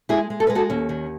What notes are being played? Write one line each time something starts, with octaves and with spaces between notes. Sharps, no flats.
G#3 E4 G#4
G#3
A4
G#3 B4
F#4 A4
D#2 C#4
D#3